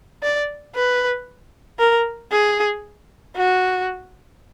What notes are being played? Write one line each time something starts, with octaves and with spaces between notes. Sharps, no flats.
D5
B4
A#4
G#4
F#4